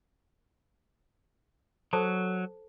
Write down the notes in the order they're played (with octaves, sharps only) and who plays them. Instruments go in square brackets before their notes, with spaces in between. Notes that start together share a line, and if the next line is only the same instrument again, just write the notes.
[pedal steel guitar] F#3 [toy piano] A4 C5 A5